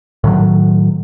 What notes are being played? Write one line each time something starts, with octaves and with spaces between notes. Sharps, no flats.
A2 D#3 F#3